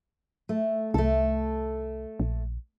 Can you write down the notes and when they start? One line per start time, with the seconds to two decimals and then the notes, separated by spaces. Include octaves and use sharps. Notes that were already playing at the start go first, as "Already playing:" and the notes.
0.49 A3
0.94 C2 A3 A4
2.20 A#1